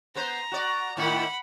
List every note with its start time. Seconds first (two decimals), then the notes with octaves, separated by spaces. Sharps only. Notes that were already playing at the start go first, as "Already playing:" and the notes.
0.15 B3 B4 C5 A#5
0.52 F#4 D5
0.97 A2 D#3 E4 F#5 B5